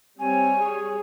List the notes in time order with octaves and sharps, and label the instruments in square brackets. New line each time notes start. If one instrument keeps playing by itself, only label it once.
[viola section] G3 C#5 [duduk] C4 [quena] G#5
[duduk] G#4